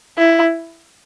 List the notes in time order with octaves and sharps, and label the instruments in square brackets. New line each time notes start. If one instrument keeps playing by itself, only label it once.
[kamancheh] E4